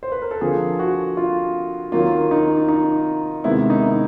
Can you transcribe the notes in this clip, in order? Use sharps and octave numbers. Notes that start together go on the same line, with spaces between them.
C5
B4
A#4
A4
D3 F3 A#3 G#4
F#4
F4
D#3 F#3 A#3 F4
D#4
D#4
C3 D#3 G#3 B3 E4
D#4